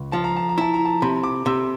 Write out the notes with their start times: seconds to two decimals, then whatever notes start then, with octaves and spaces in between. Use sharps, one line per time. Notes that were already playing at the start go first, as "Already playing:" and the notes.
Already playing: C#2
0.12 F3 A5
0.24 A#5
0.36 A5
0.49 A#5
0.58 E4 A5
0.74 A#5
0.85 A5
1.02 C3 B5
1.23 D6
1.46 C3 E6